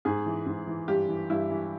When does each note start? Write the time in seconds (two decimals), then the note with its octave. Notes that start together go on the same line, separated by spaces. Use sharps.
0.05 G#2 G#4
0.26 E3
0.46 G#2
0.67 E3
0.88 G2 G4
1.08 E3
1.30 G2 E4
1.50 E3